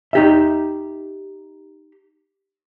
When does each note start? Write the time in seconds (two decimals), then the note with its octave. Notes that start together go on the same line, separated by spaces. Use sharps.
0.13 D#4 G4 E5